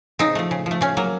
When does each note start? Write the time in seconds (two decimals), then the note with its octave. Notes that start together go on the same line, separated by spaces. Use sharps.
0.19 C#3 C4 D#4
0.35 F3 A3
0.51 C#3
0.66 F3
0.71 A3
0.81 C#3 C#4
0.97 F#3 A#3